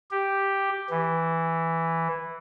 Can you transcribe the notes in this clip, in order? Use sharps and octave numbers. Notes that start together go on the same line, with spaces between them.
G4
E3